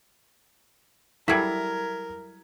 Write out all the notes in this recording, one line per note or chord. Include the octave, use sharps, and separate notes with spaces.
F#3 G3 E4 A4 A#4 G#6 B6